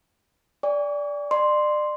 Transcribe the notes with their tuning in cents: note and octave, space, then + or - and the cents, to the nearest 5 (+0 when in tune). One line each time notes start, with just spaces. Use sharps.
D5 -15 G#5 -45 C#6 +40
D5 +35 C6 +0